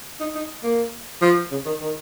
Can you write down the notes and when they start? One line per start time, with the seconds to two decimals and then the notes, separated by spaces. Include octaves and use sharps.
0.20 D#4
0.35 D#4
0.63 A#3
1.21 F3
1.51 C#3
1.65 D#3
1.81 D#3